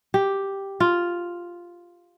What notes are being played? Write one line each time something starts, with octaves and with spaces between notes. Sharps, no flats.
G4
F4